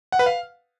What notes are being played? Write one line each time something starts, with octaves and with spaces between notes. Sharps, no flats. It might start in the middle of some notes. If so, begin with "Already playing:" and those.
F#5
B4
F5